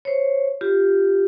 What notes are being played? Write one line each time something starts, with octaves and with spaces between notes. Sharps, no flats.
C5 C#5
F4 G4